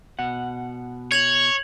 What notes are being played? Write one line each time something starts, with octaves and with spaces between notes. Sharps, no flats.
B2 F#5
C#5 G#6 F7 F#7